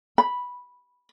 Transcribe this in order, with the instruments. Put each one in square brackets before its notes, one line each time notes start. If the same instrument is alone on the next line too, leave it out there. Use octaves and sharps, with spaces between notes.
[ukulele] B5